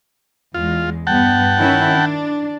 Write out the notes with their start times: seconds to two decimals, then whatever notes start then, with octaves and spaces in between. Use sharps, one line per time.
0.54 E2 G#3 F4
1.07 G2 B3 F#5 G5 A5
1.58 D#3 C#4 E4
1.96 D4